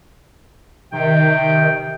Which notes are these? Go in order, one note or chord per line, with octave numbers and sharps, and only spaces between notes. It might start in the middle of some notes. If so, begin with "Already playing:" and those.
C3 D#3 G5